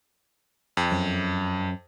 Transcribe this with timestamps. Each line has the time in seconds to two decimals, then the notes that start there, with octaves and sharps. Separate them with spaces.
0.77 F2
0.92 F#2